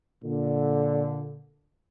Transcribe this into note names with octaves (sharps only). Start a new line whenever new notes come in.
A#2 D3